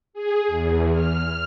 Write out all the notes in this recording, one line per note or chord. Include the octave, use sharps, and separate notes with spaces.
G#4
E2
F6